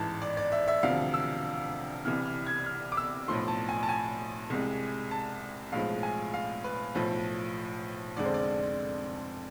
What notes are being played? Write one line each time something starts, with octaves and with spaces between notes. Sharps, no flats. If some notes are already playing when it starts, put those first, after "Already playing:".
Already playing: A1 G#2 E3 A5
D5
D5
E5
E5
E1 D2 C3 F3 F5
E6
C2 C3 E3 F6
F6
G#6
F6
D6
E6
B1 A2 F3 C6
A5
G#5
A5
G#5
C2 C3 G#3
A5
B1 A2 F3 G#3 F5
G#5
F5
B4
B1 A2 F3
F1 F2 D3 G#3 D5
C5
D5